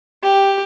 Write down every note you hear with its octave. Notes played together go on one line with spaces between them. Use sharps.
G4